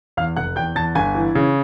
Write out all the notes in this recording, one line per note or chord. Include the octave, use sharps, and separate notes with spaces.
E2 F5 F6
F1 F#5 F#6
E2 G5 G6
E2 A5 A6
G1 G#5 G#6
E3
C#3